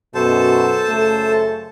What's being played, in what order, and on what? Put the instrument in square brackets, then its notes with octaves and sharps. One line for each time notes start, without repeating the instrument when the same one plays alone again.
[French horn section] F#2 B2 [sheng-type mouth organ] A4 C5 A5
[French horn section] F#2 C#3 A3